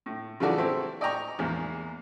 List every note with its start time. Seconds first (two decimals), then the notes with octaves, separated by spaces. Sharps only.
0.06 A2
0.40 C#3 E3 F#3 A3 F#4 D5
0.58 A3 C4 E4 G4
1.01 D5 D#5 G5 A#5 C#6
1.39 E2 G#2 A#3